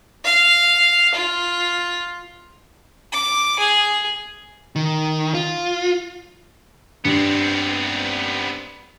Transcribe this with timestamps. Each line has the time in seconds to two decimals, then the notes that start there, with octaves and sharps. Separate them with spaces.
0.25 F5
1.15 F4
3.12 D6
3.59 G#4
4.76 D#3
5.34 F4
7.05 G2 B3 C4